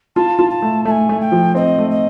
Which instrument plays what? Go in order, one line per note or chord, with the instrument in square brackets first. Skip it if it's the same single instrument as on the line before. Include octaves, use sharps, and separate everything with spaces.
[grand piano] F4 [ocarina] A5
[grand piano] F4
[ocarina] A5
[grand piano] A3
[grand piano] A3 [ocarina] A5
[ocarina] G#5
[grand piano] A3
[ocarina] G5
[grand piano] F3
[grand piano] C4 [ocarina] D#5
[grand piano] A3
[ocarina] D#5